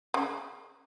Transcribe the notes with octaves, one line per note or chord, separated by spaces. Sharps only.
C#3